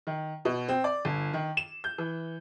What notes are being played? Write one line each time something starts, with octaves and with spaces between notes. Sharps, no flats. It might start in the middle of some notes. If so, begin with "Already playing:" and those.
D#3
B2
C4
D5
G1
D#3
E7
G6
E3